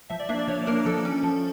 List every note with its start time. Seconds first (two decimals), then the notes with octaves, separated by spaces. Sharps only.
0.10 F3 E5
0.20 D5
0.29 A#3 D4 E5
0.39 D5
0.48 F3 C#5
0.67 A#3 D4 A#4
0.85 F3 A4
1.05 C#4
1.23 F3